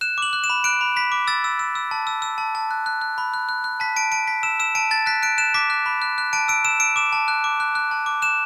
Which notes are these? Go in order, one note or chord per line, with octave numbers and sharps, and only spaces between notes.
F#6 E7
D6 F#7
F#6
E7
B5
F#6 D7
B5
B5 B6
D6
E6 A6
E6
E6
E6
A5
E6
E6
A5
A5
F#6
F#6
F#6
B5
F#6
F#6
F#6
A5 B6
A5 D7
A5 D7
A5 B6
E6 E7
E6 E7
A5 D7
A5 A6
F#6 B6
F#6 D7
F#6 E7
D6 B6
F#6
B5
F#6
F#6
A5 D7
E6 D7
E6 E7
E6 D7
D6 E7
A5
F#6
D6
F#6
F#6
A5
D6
F#6 E7